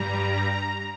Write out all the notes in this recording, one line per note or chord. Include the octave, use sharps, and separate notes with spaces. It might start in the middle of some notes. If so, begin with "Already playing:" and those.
Already playing: G2 G3 A#5